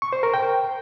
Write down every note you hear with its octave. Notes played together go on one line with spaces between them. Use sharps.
C#6
C5
A#4
G5